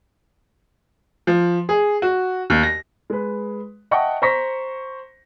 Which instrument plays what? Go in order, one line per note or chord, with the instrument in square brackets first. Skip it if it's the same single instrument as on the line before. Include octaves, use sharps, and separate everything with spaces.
[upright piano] F3
G#4
F#4
D#2
A#6
[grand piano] G#3 B4
D#5 E5 F#5 G5 A5 C#6
C5 A#5 C#6 A#6 B6